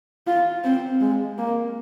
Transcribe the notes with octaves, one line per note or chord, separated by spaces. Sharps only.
F4
C4
G#3
A#3